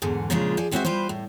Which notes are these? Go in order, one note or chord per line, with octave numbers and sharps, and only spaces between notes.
E2 G#2 D3
A#2 C#3 F3 G#3 D4 F4
F3 G#4 D5
G#3 C4 F#4 B4 C5 E5
G3 F4 B4 C5
A2